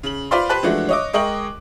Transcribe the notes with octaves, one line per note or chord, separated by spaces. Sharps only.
C#3 F#7
F4 B4 C5 D5 F5 C6
G4 B4 C5 A5 F#6
E3 F3 G#3 A3 D4 F#4
C#5 D#5 D6
G#3 A#4 D#5 G5 C#6 F#7